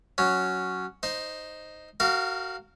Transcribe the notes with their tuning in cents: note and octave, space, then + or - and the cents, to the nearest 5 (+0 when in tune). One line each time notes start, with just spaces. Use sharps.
F#3 +0 C#4 +0
D#4 +0 C5 +0
F#4 +15 A#4 -30 F5 +0